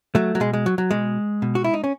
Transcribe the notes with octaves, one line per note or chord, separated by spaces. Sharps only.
F#3 A3
F#3
B2 G#3
G#3
F#3
F#3
B2 G#3
B2
F#4
E4
D#4
C#4